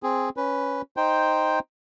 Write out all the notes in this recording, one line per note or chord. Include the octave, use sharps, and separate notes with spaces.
C4 G#4
C#4 B4
D#4 C5 G5